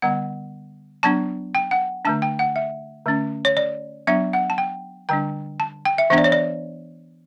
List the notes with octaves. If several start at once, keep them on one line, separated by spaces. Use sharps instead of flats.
D3 G3 B3 F#5
F#3 B3 D4 A5
G5
F#5
D3 A3 D4 A5
G5
F#5
E5
D3 A3 C#4
C#5
D5
F#3 B3 D4 E5
F#5
A5
G5
D3 G3 D4 G5
A5
G5
E5
E3 B3 D4 E5
D5
C#5
D5